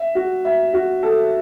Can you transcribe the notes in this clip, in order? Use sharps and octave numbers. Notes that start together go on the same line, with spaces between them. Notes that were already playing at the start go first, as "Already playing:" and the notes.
Already playing: E5
F#4
E5
F#4
A4